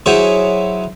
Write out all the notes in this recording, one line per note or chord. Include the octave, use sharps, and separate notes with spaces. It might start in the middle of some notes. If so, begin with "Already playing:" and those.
F#3 E4 G#4 C5 C#5